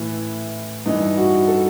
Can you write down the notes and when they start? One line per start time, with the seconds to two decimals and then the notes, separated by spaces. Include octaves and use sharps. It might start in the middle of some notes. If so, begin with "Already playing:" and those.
Already playing: A2 E3
0.86 G2 E3 D#4
1.17 F#4
1.47 A4